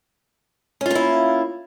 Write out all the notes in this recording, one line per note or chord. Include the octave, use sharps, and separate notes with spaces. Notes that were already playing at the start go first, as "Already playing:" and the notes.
A#3 C#4 E4 F4